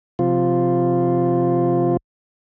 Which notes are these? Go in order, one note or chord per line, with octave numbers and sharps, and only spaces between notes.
C3 F3 F4